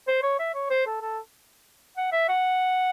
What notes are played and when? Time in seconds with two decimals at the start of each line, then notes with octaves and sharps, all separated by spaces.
0.07 C5
0.23 C#5
0.39 E5
0.54 C#5
0.70 C5
0.86 A4
1.02 A4
1.97 F#5
2.12 E5
2.28 F#5